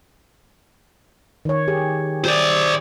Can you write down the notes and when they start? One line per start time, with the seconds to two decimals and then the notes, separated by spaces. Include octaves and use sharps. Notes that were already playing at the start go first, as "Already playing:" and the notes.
1.45 D#3 C#5
1.68 G4 G#4
2.25 C5 D5